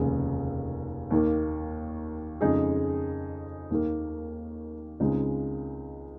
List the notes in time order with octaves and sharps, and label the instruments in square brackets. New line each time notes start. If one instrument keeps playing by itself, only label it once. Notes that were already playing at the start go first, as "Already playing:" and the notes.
Already playing: [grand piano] F1 D#2 C#3 G#3
D#2 D#3 A#3
F2 C#3 G#3 D#4 G#4
D#2 D#3 A#3
C#2 C#3 G#3 C4 D#4